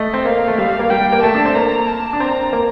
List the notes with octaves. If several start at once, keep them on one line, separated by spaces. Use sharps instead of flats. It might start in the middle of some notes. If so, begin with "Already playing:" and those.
Already playing: A3 D#5
C4
A#3 F5
A3
G3 F5
G3
A#3
G3 G5
A#3
A3 A5
D4
C4
A#3 A#5
A5
D4
C4 A#5
A#3